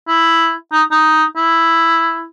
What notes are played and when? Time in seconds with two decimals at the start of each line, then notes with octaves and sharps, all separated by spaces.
0.08 E4
0.73 D#4
0.92 D#4
1.36 E4